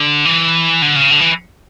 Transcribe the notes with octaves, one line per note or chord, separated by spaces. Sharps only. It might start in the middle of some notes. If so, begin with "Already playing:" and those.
Already playing: D3
E3
D3
C#3
D3
E3